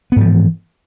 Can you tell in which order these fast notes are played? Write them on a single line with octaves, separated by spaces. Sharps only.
B3 G#2 F3 E3